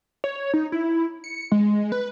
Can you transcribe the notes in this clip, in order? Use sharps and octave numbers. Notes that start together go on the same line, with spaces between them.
C#5
D#4
E4
C#7
G#3
B4